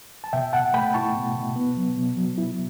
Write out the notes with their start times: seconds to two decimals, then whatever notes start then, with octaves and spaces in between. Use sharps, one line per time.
0.24 A5
0.33 B2 E5 G5
0.53 B2 F#5 A5
0.74 A3 G5 B5
0.94 E4 A5 C#6
1.15 B2
1.35 B2
1.56 B3
1.76 F#3
1.97 B2
2.17 F#3
2.38 E4